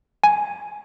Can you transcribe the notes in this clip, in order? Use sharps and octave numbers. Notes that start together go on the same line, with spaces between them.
G#5